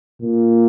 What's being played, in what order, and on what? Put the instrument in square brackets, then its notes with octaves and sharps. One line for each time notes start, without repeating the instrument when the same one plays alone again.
[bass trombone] A#2